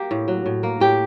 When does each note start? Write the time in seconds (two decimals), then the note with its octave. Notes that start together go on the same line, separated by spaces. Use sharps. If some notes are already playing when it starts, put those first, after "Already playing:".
Already playing: A#3 G4
0.11 A2
0.28 F#3
0.46 A2
0.63 A#3
0.80 A2 G4